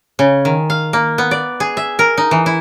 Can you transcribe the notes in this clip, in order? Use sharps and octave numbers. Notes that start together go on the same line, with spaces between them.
C#3
D#3
F5
A#3
B3
D5
G#4
E5
A#4
D#4
E3
E4